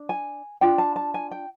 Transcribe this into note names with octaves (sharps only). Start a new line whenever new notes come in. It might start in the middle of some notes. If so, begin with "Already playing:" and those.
Already playing: D4
G#5
D4 F4 G5
A5
A5
G#5
G5